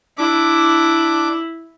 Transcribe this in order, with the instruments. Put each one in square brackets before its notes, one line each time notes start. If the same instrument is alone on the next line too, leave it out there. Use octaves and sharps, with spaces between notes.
[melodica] D4 D6 [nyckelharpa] E4